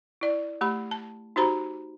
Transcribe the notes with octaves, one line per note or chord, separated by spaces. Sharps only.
E4 D5
A3 G4 B5
A5
D#4 F#4 G4 C5 A#5 B5